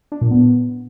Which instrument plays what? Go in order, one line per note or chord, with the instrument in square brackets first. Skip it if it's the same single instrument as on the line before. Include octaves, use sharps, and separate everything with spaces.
[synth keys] D4
A#2
B3